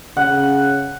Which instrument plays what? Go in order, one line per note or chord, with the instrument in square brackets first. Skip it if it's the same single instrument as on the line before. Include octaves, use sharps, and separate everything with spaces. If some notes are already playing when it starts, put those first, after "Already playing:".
[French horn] C#3 [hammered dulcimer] F#5